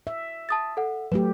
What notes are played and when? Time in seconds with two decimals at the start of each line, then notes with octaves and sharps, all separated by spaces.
0.07 E5
0.49 A5 D#6 A6
0.77 A4 F#5
1.12 F#3 A3 G4 B4